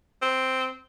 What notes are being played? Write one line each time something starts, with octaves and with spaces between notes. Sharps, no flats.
C4